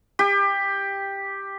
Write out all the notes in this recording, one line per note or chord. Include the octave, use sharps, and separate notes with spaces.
G4